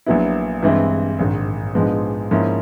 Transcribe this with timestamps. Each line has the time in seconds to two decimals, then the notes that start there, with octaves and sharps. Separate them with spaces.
0.06 A#1 A#2 F#3 B3 E4
0.63 G2 E3 G#3 C4 E4
1.19 A#1 G#2 D#3
1.75 A#1 G#2 F3 G#3 B3
2.31 G#2 F3 A#3 C#4 E4